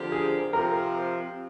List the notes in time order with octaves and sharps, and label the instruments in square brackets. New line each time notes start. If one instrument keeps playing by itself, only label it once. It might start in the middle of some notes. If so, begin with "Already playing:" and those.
Already playing: [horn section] D3 F3 C4 G4 A#4
[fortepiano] G#4
[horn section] C3 F3 C4 [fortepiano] A#4